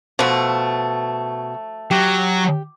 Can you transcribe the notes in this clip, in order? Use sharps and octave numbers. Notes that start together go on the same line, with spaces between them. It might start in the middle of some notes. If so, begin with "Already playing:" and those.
B2 F3 A3
F#3 G4